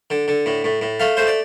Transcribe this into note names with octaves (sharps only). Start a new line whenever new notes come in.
D3
D3
A2
A2
A2
A3 F5
A3 C5
D5